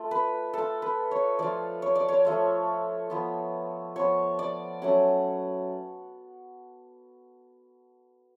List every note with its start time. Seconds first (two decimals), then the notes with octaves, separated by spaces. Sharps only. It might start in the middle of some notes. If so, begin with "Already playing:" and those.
Already playing: A3 F4
0.11 B4
0.54 A3 F4 A4
0.82 B4
1.11 C#5
1.39 F3 A3 F4 D5
1.82 C#5
1.95 D5
2.09 C#5
2.25 F3 A3 F4
3.10 F3 B3 F4
3.96 F3 B3 F4 C#5
4.39 D5
4.82 F#3 A3 C#4 F#5